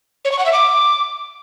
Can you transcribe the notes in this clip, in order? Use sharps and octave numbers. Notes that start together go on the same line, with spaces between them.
C#5
C#6
F#5
E5
D6